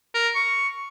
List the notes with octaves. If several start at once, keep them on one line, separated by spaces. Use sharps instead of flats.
A#4
C#6